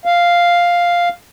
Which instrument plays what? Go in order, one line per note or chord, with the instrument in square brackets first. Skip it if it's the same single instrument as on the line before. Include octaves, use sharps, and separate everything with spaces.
[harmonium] F5